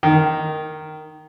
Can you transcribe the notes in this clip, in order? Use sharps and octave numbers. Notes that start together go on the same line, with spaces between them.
D#3